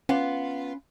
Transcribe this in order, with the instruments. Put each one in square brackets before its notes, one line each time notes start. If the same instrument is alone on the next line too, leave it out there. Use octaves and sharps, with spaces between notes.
[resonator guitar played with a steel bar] B3 F4 [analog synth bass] C#4